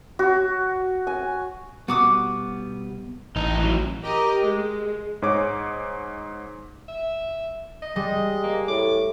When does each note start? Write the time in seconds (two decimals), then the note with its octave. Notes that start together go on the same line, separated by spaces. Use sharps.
0.19 F#4
1.07 G#5
1.88 B2 G3 B3 F#4 D6 D#6
3.36 A1 D#4
3.57 E3 F#3
4.02 G4 A#4 D#5
4.43 G#3
5.22 G#2 G#4 C#5 D6
6.88 E5
7.82 D#5
7.96 G3 G#3 D#5
8.44 A#3
8.68 A2 D6